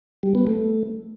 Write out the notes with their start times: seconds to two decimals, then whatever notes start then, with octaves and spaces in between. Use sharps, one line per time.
0.23 G3
0.35 B3
0.47 A3